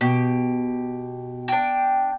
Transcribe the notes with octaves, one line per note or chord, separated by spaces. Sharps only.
B2 G4
D4 G5